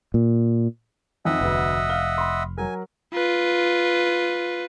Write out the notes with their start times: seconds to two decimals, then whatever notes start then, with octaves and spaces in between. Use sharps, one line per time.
0.14 A#2
1.25 F2 D#3 F3 D#5 E5 F#5
1.41 F1 D2 B3
1.90 F5 F6 G7
2.18 B5 C6
2.58 F#3 A#4 G#5
3.13 F4 B4